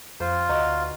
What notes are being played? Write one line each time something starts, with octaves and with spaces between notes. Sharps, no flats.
F2 F4 C5
D2 D#4 F#4